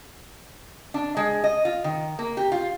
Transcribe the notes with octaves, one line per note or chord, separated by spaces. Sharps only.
D4
G#3
D#5
F4
D#3
A#3
G4
F4